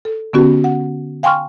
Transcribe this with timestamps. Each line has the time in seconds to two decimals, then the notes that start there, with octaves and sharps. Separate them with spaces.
0.05 A4
0.33 D3 B3 C#4 F#4 G4
0.64 F#5
1.23 F5 G5 G#5 C6 C#6 F6